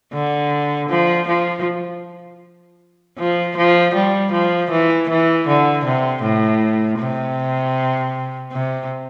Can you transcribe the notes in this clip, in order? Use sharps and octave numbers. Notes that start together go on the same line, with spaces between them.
D3
F3
F3
F3
F3
G3
F3
E3
E3
D3
C3
A2
C3
C3